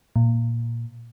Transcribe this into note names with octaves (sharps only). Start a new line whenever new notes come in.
A#2